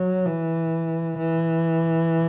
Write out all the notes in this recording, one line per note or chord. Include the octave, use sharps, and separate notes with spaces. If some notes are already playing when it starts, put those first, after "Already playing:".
Already playing: F#3
E3
E3